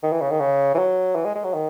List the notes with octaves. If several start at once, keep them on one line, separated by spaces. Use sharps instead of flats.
D#3
E3
C#3
D#3
C#3
E3
F#3
E3
G#3
G#3
F#3
D#3